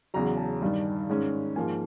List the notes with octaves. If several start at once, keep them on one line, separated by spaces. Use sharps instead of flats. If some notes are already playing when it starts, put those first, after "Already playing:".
E2 C#3 F#3 A#5
A5
G2 D#3 G3
G#2 D#3 G#3 C#4
G#2 F3 A#3 G#5